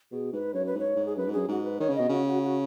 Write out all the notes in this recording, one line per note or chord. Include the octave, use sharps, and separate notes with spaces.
B2 G#4
G#2 B4
F#2 C#5
B4
G#2 C#5
G#2
G#4
F#2 B4
G#2
F#2 G#4
G#2 F#4
B4
D#3 C#5
C#3
B2 D#5
C#3 F#4
F#4
F#4